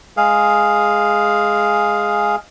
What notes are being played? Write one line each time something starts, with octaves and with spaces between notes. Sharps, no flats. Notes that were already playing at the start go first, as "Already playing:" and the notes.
G#3 G#4 F5